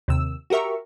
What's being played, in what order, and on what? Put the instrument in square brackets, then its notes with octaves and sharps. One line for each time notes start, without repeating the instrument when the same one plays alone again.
[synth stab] D#2 C3 E6
F#4 G4 A#4 E5 C#6